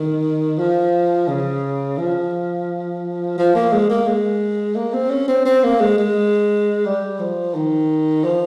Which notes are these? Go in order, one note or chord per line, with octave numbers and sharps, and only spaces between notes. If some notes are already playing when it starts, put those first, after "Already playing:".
Already playing: D#3
F3
C#3
F3
F3
A#3
G#3
A#3
G#3
A#3
C4
C#4
C4
C4
A#3
G#3
G#3
G3
F3
D#3
F3